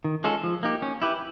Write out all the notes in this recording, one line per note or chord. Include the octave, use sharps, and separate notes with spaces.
D#3
G#3 C#4 F4 A4
F3
A#3 D#4 G4
C#4
E4 G4 B4